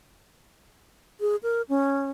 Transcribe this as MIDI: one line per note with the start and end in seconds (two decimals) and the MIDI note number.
1.21 1.36 68
1.43 1.62 70
1.69 2.10 61